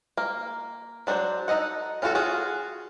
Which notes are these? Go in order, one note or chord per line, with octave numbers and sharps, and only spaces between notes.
A#3
F#3 D4 F#4 G#4 C5
D#4 A4 D#5 F#5
C#4 D4 F4 F#4 A4
F4 F#4 G#4